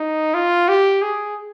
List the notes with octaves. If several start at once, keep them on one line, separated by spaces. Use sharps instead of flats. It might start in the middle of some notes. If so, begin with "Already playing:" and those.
Already playing: D#4
F4
G4
G#4